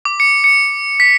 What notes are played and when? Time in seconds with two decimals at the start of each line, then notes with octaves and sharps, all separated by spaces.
0.05 D6
0.20 C#7
0.44 C#7
1.00 B6